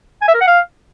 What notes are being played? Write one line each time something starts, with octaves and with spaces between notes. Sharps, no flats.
G#5
E5
A#4
F#5
F5